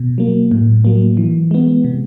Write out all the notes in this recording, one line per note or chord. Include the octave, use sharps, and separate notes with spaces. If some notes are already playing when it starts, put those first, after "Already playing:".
Already playing: B2
F#3 A#3
A2
F#3 A#3
E3
G#3 B3
C3